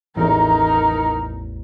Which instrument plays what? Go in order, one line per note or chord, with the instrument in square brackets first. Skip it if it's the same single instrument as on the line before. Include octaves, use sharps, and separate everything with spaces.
[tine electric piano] A1 E2 [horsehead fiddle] D#4 A#4